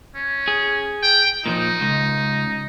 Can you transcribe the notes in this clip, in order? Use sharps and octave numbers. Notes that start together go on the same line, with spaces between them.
C#4
G#4
G5
A#2 E3 F3 D#4
C#2